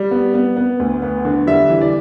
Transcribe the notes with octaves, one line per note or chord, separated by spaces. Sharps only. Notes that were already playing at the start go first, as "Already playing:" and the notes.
Already playing: G3
B3
B3
B3
D2
B3
D3
G3 E5
E3
D5